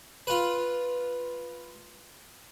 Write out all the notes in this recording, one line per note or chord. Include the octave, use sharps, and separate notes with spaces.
F4 B4